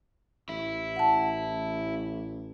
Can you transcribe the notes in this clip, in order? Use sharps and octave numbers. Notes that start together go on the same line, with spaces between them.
A1 E4
F#5 A5